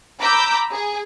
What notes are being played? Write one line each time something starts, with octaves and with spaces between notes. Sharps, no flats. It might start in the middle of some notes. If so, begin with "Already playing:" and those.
A#5 B5 D6 E6 G6
G#4